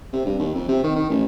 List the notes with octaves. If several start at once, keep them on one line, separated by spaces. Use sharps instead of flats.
C3
G2
D#2
F2
C3
D#3
D#3
A1